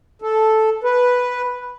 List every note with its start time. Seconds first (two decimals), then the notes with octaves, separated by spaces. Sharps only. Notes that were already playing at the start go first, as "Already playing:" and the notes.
0.22 A4
0.84 B4